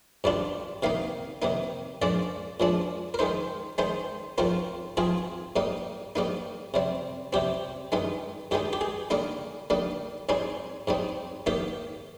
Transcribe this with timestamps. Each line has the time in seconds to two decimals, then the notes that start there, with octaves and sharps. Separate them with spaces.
0.24 G#2 D#3 G3 D4 F4
0.83 C3 D#3 A#3 D#4 F5
1.42 C3 D#3 A#3 D#4
2.02 A#2 F3 G#3 D4 D5
2.60 A#2 F3 G#3 D4
3.14 A#4
3.19 D#3 G#3 D#4 C5
3.78 D#3 G#3 D#4 C5
4.38 G#2 F3 C4 F4 A#4
4.97 G#2 F3 C4 F4 G#4
5.56 G#2 G3 A#3 D#4
6.16 G#2 G3 A#3 D#4
6.74 C3 G3 C4
7.33 C3 G3 C4 G4
7.92 G2 D#3 G#3 D#4
8.51 G2 D#3 G#3 D#4 G4
8.73 G4
8.81 G#4
9.10 D3 G3 A#3 D#4 A#4
9.70 D3 G3 A#3 D#4
10.29 G#2 G3 C4 D#4 G#4
10.87 G#2 G3 C4 D#4
11.46 G#2 D#3 A#3 D#4 G4